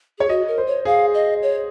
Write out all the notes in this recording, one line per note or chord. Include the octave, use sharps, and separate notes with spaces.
G#4 C#5
F#4 D#5
A#4
C5
C#5
G#4 F5
D#5
C#5